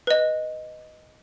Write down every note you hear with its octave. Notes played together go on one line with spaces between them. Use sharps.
B4 D#5